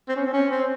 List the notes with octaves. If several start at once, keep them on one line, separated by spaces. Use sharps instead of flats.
C4
C#4
C4
C#4
C4